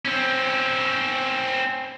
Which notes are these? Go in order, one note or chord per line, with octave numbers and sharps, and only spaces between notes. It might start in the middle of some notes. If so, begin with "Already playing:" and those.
C4 C#4